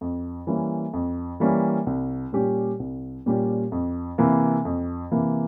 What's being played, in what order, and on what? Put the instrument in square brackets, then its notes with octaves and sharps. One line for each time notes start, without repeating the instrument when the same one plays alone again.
[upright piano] F2
E3 G3 A#3 C#4
F2
E3 G3 A#3 C#4
C2
A#2 G3 C#4 G4
C2
A#2 G3 C#4 G4
F2
C3 E3 A#3
F2
C3 E3 A#3